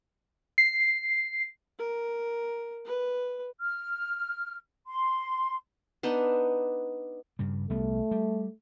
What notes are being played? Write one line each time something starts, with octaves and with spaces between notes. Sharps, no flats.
C7
A#4
B4
F6
C6
B3 D4 D#4
G2 C#3 G3
C2 G3 A3 B3
G3